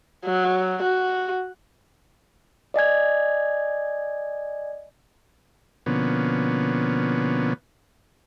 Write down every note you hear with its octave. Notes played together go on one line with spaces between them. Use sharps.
F#3
F#4
D5 D#5 G#5 G#6
B2 D3 F3 A#3 B3 C#4